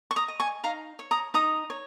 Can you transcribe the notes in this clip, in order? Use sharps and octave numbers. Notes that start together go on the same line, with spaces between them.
C#6
A#5 D#6
D#5
G#5 C#6
D#4 F5 A#5
C#5
A#5 D#6
D#4 A#5 D#6
C#5